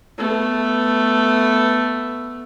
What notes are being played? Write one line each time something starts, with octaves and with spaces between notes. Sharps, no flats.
A3 B3